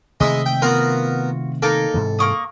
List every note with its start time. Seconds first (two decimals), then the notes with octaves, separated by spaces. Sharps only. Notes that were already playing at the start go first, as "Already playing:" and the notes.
0.20 C3 D#3 G#3 A3 E4 D#5 E5
0.46 G5
0.62 B3 F4 F#4 A#4
1.62 A#3 D#4 A4
1.94 G#2 C3 E3
2.19 A#3 C#6 D#6